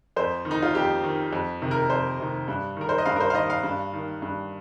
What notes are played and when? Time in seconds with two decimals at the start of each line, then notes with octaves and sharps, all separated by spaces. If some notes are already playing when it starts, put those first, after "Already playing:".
0.16 F2 C5
0.45 D#3
0.51 D#4
0.62 F4
0.74 F2 G4
1.04 D#3
1.33 F2
1.62 C3 D#3
1.71 A#4
1.90 F2 C5
2.20 C3 D#3
2.48 G2
2.77 D#3 A#4
2.89 C5
2.98 D#5
3.06 G2 F5
3.16 A#4
3.20 C5
3.30 F5
3.34 D#3 D#5
3.50 F5
3.63 G2
3.94 D#3
4.22 G2